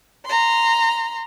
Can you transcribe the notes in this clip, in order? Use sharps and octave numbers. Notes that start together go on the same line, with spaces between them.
A#5 C6